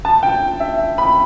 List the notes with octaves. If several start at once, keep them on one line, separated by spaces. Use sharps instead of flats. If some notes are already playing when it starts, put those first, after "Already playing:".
A5
G5
E5
B5